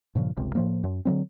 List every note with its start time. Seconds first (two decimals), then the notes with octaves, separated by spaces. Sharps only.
0.15 G2 A#2 C#3 F3
0.37 G1 C#2 C3
0.55 A2 F3 A#3
0.84 F#2
1.05 D3 F3 F#3 C4